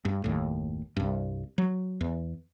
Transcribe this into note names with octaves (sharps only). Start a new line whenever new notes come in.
G2
F#1 D#2 A2
C2 G2
F#3
E2